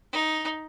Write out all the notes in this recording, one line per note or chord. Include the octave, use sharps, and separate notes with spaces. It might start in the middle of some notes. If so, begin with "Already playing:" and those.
D#4